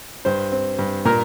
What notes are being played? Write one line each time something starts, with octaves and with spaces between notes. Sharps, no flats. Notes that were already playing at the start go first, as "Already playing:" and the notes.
G2 C5
C4
G2
A#2 A#4